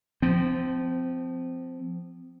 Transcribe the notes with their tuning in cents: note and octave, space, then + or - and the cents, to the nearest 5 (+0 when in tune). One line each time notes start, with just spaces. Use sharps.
F3 +0 C4 -25